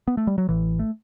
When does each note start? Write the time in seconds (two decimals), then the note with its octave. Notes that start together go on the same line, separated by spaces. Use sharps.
0.08 B3
0.17 A3
0.27 G3
0.38 F#3
0.48 A1 A2 E3
0.79 A3